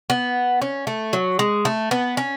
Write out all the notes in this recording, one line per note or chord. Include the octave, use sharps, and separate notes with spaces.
B3
C#4
A3
F#3
G#3
A3
B3
C#4